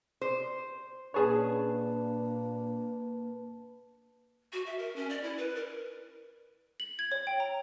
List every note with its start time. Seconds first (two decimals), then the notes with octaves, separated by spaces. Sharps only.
0.21 C5
1.14 A#2 A#3 C#4 D4 G#4 B4 C#5 A5
4.53 F#4
4.66 E5
4.79 A#4
4.96 C#4
5.10 D5
5.24 E4
5.37 B4
5.55 A#4
6.80 F#7
6.99 G#6
7.12 C#5
7.27 G5
7.40 A#5